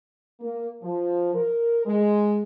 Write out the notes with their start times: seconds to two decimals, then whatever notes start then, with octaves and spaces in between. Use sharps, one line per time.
0.40 A#3
0.82 F3
1.34 A#4
1.86 G#3